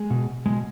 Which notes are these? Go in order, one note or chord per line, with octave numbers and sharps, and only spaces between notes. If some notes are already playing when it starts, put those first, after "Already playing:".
Already playing: G#3
B2
B2 G#3